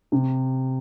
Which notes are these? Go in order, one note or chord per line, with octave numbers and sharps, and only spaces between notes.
C3